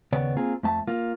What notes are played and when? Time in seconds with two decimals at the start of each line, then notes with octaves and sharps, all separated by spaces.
0.12 D#2 C#3 B3 C#5 D5
0.37 A#3 C4 F4 G#4
0.63 F2 A3 A5
0.87 A#3 F4